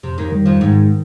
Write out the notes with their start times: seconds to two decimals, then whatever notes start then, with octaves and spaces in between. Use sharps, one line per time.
0.03 F2 C3
0.18 D#2 D#3
0.32 D#3 G3
0.46 F2 F3
0.60 G#2 D#3